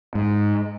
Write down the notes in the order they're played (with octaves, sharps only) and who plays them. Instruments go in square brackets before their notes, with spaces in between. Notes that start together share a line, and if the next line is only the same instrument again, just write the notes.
[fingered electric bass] G#2